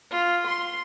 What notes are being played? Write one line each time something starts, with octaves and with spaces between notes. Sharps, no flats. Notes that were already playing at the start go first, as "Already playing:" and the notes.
F4
C6